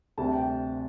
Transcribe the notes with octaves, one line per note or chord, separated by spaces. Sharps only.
D2 C3 G3 A5
G5